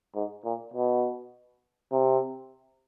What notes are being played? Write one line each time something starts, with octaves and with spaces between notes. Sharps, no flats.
G#2
A#2
B2
C3